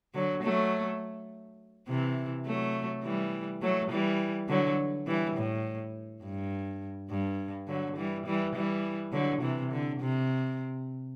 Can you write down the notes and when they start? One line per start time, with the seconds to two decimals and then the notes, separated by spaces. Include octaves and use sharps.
0.14 D3 F#3
0.43 F#3 A3
1.88 C3 E3
2.46 F#3 A3
3.04 E3 G3
3.62 F#3 A3
3.91 E3 G3
4.49 D3 F#3
5.07 E3 G3
5.36 A2
6.24 G2
7.10 G2
7.68 D3 F#3
7.96 E3 G3
8.26 E3 G3
8.55 E3 G3
9.12 D3 F#3
9.42 C3 E3
9.71 D3
10.00 C3